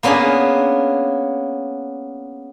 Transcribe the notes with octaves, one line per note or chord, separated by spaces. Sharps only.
A#3 B3 C#4 D4 G#4